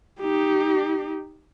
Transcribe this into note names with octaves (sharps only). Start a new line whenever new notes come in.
D#4 G4